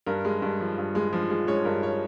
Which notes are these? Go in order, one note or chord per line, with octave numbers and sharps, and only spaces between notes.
G2 A#4
G#3
G2
F3
G2
G#3
F3
G#3
G#3 C#5
G2 A#4
C#5